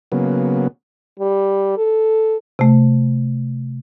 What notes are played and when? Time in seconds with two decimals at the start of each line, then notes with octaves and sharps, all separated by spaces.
0.12 C#3 F#3 A#3 B3
1.20 G3
1.77 A4
2.59 C3 A3